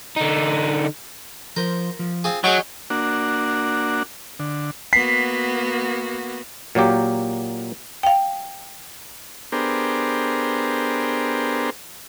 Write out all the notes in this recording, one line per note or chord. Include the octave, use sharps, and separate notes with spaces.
D3 D#4
F3 A#4 C5
F3
C4 F4 G#4
F#3 G#4 D#5 G5 C#6
A#3 D4 F#4
D3
A#3 B3 F#4 B6 C7
A#2 F#3 A#3 G4
F5 G5
B3 D4 G4 G#4 A#4 C5